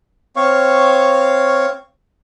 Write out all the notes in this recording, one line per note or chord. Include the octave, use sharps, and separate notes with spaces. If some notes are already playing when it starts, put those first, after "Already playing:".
C4 C#5 F5 C#6